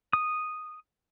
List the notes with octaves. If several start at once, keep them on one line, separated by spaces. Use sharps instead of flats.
D#6